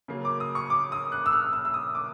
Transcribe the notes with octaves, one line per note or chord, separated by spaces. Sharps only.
C#3 F#3 A#3
D6
D#6
C#6
D6
D#6
F#6
E6
F6
E6
E6
D#6
D6